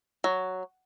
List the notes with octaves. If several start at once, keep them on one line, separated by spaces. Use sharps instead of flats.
F#3